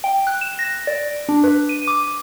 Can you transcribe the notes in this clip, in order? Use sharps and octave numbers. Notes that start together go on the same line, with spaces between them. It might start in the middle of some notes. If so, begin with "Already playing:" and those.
G5
F#6
E7
A#6
D5
D4
B4
D#7
D6